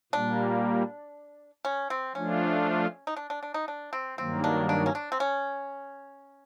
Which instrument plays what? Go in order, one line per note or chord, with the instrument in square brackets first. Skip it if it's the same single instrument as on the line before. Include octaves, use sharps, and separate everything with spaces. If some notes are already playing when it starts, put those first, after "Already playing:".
[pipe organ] A#2 G3 A#3 [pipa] D4
[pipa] C#4
C4
[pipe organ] F3 A3 D4 F4 [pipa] C#4
[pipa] D#4
D4
D4
D4
D#4
D4
C4
[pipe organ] G2 D#3 F#3 A#3 [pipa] C4
[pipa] D4
D4
C#4
D4
C4
C#4